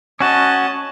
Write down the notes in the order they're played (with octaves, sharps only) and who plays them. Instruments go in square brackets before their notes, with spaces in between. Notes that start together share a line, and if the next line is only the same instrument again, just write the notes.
[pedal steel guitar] C#4 F#4 [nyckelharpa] D#5 A5